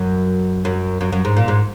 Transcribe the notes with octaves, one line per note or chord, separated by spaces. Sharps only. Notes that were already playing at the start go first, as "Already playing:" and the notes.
Already playing: F#2
F#2
F#2
F#2
G#2
A#2
G#2